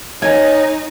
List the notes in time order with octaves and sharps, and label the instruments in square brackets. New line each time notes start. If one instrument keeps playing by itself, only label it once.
[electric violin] D#4 [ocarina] C#5 [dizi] D#5 [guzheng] G#5